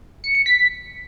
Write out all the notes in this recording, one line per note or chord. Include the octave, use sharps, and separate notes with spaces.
C#7
C#7
B6